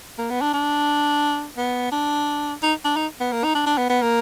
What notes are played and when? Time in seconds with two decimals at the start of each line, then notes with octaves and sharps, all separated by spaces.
0.18 A#3
0.30 B3
0.41 D4
0.54 D4
1.57 B3
1.92 D4
2.63 D#4
2.85 D4
2.96 D#4
3.20 B3
3.32 A#3
3.44 D#4
3.55 D4
3.66 D4
3.78 B3
3.89 B3
4.02 A#3